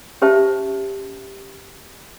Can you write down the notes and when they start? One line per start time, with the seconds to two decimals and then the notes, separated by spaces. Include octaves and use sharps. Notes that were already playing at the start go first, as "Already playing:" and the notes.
0.22 C#4 G4 C5 E5 A5